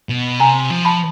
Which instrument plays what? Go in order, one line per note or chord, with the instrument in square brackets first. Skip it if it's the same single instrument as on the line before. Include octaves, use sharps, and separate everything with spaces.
[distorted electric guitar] B2
[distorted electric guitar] C3 [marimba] G#5 A#5
[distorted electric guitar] F3
[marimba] A5 B5